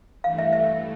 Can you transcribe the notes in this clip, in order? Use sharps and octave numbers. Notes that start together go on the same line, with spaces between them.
G2 E3 A3 F5
E5
E5